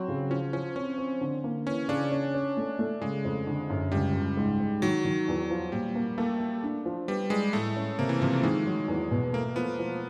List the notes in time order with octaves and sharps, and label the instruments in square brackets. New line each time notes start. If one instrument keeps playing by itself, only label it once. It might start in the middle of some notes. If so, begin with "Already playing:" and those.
Already playing: [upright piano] F#3 [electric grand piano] C4
[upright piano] C#3
[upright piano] F3 [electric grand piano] C#4
[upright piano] F3 [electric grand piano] C#4
[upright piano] C4 [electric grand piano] C#4
[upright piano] C4
D3
A#3
[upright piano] E3 [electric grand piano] C#4
[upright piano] C#3 [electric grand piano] D4
[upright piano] C#4
C#4
A3
A3
[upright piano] C#3 [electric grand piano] G#3
[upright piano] F2
D3
F#2
[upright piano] C#2 [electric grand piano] G3
[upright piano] C#2
G#2
G#2
[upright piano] D#3 [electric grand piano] F#3
[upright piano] D#3
E2
F3
[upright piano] A#2 [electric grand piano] G3
[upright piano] A#3
[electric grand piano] A3 [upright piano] A#3
[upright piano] A#3
D4
F3
[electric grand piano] G3 [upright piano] B3
[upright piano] G3 [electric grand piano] G#3
[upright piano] A2 [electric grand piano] A3
[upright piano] C#4
[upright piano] C3 [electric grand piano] A#3
[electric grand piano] E3
[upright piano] C3 [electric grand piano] F3
[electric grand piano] A3
[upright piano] D#3 [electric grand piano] G#3
[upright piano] F#3
E2
B2
[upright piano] A3 [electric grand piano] A#3
[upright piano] F3 [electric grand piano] B3
[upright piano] F3